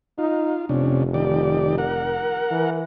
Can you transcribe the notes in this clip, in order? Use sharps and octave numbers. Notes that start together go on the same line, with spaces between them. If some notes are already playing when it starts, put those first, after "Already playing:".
D#4 F4
F1 C3 C#4 D4
D#3 G4 D5
A#4 F#5
E3